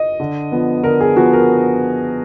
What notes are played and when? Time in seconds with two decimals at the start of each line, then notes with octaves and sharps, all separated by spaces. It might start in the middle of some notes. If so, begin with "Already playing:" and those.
Already playing: D#5
0.20 D3
0.52 F3 B3
0.84 D3 A#4
1.01 G#4
1.16 F3 B3 F#4
1.33 A#4